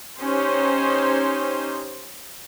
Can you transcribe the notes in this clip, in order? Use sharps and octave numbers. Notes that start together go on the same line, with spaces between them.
C#4 D#4 G4 C5